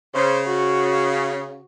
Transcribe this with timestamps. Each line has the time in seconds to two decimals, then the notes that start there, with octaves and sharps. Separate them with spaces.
0.15 C#3 C5
0.47 F#4